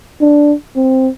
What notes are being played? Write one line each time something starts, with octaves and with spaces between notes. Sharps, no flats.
D4
C4